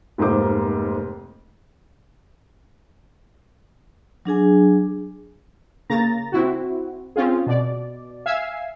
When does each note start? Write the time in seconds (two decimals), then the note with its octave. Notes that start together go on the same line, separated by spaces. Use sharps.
0.18 F1 G#2 A#3 C5 D6
4.25 F#3 D4 G#4 G#5
5.90 C#3 A#3 A#5 A6 A#6
6.32 C4 E4 F#4
7.16 C4 C#4 F4 G#4
7.47 B2 D5
8.26 E5 F5 G#5 E6 G#6 C7